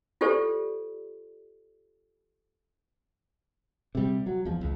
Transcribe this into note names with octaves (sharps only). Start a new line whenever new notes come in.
F4 G4 A4 C5 D5
C3 G3
F#3
E2 F3
C#2